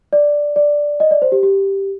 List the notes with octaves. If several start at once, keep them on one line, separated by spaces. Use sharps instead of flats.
D5
D5
D#5
D5
C5
G4
G4